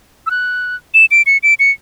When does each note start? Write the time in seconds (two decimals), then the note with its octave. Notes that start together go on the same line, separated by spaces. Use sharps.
0.27 E6
0.31 F#6
0.94 E7
1.11 D7
1.26 C#7
1.43 D7
1.59 C#7